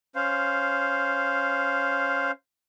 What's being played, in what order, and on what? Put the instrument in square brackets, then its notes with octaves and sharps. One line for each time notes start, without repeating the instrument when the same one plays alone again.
[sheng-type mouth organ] C#4 C5 F5